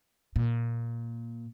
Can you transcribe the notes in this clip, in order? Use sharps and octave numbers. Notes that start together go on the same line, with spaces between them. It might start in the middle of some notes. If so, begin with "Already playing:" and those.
A#2